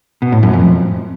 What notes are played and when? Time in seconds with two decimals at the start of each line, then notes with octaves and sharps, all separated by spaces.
0.22 B2
0.32 A2
0.43 F#2
0.53 F2